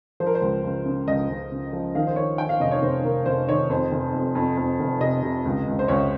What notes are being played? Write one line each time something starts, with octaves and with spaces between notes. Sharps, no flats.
F3 C5
A#4
C5
C#2
C#2
C#3
C#2 D#5
C#2
C#3
F3
D#3 F5
C5
D#3 C#5
D#3 G5
F5
F1 D#5
C#5
F1 C5
F1 A#4
F1 C5
D#3 C#5
F2 C5
F1
F2
F2
F2
F1
C3 D#5
C3
C#2
C#2
C5
C#2 C#5